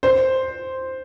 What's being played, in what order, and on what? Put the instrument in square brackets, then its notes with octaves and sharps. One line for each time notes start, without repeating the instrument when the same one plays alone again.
[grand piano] C5